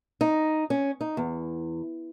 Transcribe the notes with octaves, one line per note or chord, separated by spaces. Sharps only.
D#4
C#4
D#4
E2